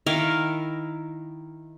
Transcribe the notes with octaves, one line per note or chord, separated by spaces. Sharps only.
D#3 E4 A#4 F5